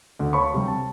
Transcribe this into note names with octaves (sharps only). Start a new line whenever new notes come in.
D2
C#5 F5 A5 B5 C#6
C3 G3
A5